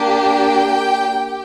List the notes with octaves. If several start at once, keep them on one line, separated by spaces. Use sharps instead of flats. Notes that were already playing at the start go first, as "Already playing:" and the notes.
Already playing: A#3 D4 G4
G5
G4